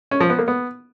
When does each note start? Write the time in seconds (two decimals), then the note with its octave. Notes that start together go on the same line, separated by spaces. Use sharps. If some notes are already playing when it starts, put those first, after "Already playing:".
0.11 C#4
0.20 F3
0.30 B3
0.39 A#3
0.48 B3